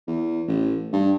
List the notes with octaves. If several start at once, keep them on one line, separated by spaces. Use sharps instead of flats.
E2
A1
G2